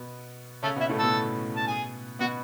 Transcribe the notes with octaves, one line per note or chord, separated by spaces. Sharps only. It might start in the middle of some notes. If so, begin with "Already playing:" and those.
Already playing: B2 B3
C#3 A3 C#4 A4
B2 B3 E4 E5
A2 A3
B2 B3 A4 A5
A5
G#4 G#5
B2 B3 F#4 F#5